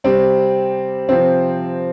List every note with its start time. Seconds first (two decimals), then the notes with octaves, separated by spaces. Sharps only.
0.04 C3 G3 C4
1.09 C3 F3 C4